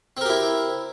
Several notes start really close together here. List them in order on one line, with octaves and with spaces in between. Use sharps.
C4 A#4 G4 E4